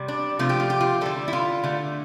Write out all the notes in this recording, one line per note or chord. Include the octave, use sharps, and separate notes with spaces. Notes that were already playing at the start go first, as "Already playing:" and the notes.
Already playing: C3 G3
D4
C3 F3 A3 F4
G4
F4
G4
F4
D3 G3 A4
E4
F4
D3 A3